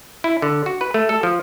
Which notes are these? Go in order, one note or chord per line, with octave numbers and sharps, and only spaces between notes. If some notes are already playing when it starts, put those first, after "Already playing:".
E4
D3
F#4
B4
A3
A4
F3